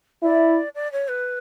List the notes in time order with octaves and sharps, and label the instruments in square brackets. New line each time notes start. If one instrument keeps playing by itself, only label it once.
[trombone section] E4 [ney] D5
[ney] D5
C#5
B4